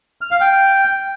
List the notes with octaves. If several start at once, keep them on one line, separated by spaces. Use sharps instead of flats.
F6
F5
G5